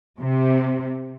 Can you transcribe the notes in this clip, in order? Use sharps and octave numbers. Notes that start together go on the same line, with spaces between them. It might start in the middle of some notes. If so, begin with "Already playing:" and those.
C3